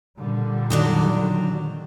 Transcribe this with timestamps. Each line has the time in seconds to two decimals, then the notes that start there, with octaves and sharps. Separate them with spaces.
0.18 A#2 D3 G3
0.70 D#3 F#3 D4